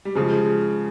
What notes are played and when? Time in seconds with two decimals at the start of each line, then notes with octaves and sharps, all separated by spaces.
0.05 G3
0.15 C#3 F3 G#3